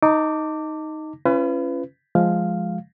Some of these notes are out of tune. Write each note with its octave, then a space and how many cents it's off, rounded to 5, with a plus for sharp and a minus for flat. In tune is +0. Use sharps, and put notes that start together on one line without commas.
D#4 +5 A5 +40 D6 -5
C#4 -10 F4 -40 B4 +25
F3 +0 G#3 +0 F5 +0